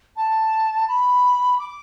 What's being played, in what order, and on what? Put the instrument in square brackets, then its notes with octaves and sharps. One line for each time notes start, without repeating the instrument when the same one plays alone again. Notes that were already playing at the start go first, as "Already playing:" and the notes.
[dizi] A5
B5
D6